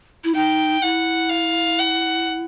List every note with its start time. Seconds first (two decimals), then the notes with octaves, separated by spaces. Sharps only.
0.24 E4
0.35 D#4 G5
0.82 E4 F#5
1.29 F5
1.78 F#5